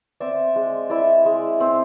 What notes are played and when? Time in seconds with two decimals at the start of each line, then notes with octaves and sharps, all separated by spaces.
0.20 C4 D5 E5
0.56 G#3
0.90 E4 D5 E5
1.25 G#3
1.60 C4